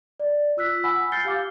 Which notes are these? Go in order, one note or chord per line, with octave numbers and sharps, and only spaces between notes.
D5
F4 E6 F#6 B6
F#5 G#5 B5 E6
F6 G6 A6 C7 C#7 G7
G4 F5 D6